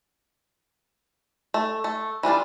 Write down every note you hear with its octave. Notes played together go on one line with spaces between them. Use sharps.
A3
A3
E3 G3 D4 F4